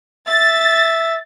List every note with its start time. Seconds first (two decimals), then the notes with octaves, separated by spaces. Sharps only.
0.28 E5 A6